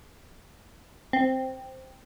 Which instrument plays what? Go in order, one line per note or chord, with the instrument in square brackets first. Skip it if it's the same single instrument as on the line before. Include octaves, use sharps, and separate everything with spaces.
[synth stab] C4